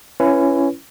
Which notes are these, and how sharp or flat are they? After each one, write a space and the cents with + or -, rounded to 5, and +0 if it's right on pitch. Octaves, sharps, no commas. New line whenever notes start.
C#4 +0 E4 +30 B4 -5